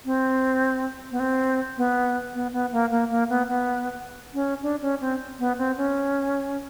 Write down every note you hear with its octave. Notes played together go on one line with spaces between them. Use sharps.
C4
B3
C4
B3
B3
B3
A#3
A#3
A#3
B3
B3
C#4
D4
C#4
C4
B3
C4
C#4